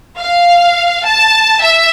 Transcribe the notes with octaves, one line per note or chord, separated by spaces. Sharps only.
F5
A5
E5